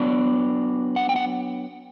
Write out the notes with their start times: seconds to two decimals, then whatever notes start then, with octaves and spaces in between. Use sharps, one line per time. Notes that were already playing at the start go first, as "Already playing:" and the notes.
Already playing: F#3 B3 D4 D5
0.96 F#5
1.09 G5
1.16 F#5